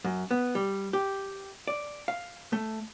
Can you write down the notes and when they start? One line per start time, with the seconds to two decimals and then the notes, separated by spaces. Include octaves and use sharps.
0.05 F#2
0.31 B3
0.55 G3
0.93 G4
1.68 D5
2.08 F5
2.53 A3